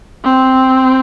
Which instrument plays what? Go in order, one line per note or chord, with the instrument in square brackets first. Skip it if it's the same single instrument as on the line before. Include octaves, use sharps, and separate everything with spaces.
[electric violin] C4